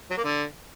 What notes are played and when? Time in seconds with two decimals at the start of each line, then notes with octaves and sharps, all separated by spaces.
0.11 F#3
0.17 A#3
0.24 D3